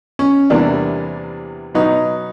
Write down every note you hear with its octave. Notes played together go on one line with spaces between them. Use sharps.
C#4
E2 C3 E3 G3 A#3 D4
B2 F#3 B3 D#4